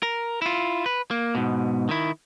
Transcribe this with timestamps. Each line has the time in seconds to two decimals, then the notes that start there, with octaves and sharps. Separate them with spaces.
0.03 A#4
0.42 E4 F4
0.86 B4
1.11 A#3
1.35 G#2 B2
1.89 D#3 E4